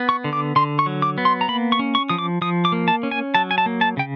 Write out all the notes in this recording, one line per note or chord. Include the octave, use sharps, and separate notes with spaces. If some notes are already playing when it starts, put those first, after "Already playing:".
Already playing: B3
C#6
D3
D6
D3 C6
C#6
F#3
D6
B3
C6
A#5
A#3 B5
C#6
C#4
C#6
F3 D#6
D6
F3 D#6
D6
A#3
A5
C#4
G#5
F#3 A5
G#5
A5
A#3
A5
C#3 G5